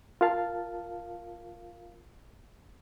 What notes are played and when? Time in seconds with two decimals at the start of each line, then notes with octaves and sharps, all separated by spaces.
0.21 F4 A#4 F5 A5